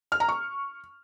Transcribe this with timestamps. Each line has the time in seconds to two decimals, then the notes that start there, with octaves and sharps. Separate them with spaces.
0.12 F6
0.20 A#5
0.29 C#6